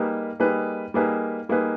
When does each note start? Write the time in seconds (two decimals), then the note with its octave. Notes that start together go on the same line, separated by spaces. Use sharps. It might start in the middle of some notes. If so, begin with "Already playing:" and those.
Already playing: G3 A#3 D#4 G#4 B4
0.40 G3 A#3 D#4 G#4 B4
0.94 G3 A#3 D#4 G#4 B4
1.49 G3 A#3 D#4 G#4 B4